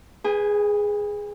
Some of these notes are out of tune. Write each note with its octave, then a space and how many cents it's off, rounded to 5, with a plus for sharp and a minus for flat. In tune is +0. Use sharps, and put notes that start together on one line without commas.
G#4 +0 B4 +0 G#5 -45